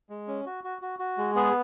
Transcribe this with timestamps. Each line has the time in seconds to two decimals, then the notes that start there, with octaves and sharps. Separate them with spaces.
0.10 G#3
0.28 C#4
0.46 F#4
0.64 F#4
0.82 F#4
0.99 F#4
1.18 G#3
1.35 B3 G#4